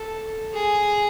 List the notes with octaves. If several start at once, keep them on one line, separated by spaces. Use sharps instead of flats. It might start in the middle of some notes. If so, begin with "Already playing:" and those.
Already playing: A4
G#4